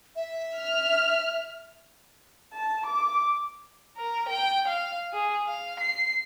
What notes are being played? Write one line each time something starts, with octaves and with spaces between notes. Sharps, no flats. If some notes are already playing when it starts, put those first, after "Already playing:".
E5
F6
A5
D6
A#4
G5
F5
G#4
F5
C7